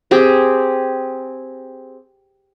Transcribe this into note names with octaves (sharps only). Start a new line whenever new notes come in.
C4 G4 G#4